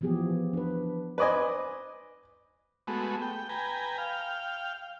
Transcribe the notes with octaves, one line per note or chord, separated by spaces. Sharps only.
E3 F3 B3 G4 G#4
D4 B4
B4 C5 D5 D#5 G#5
G#3 A3 B3 F#4
G5
B4 G5 G#5 A#5
F5 G5